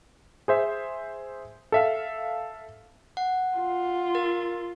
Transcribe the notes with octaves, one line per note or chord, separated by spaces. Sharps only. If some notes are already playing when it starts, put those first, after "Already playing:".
G#4 C5 E5
A4 E5 F5
F#5
F4
A#4 A6